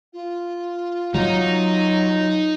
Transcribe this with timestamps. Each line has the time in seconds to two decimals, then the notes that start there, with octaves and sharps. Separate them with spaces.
0.13 F4
1.15 F#3 D#4